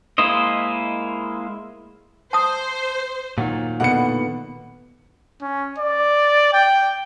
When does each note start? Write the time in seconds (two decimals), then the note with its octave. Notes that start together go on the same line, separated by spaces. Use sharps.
0.18 G#3 A#3 E4 C5 D#5
2.33 C5 A5 D#6
3.38 A#2 D#3 F#3
3.80 B2 D3 B3 F#5 C#7
5.42 C#4
5.78 D5
6.53 G5